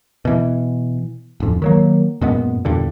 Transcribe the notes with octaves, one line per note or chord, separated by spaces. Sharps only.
B2 E3
D1 F2
D#3 F#3 A#3
F#2 A#2 G#3 B3
E2 G2 A#2 D3